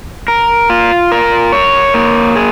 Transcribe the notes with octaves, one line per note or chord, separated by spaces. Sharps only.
A#4
F4
A#4
C#5
A#3
G#4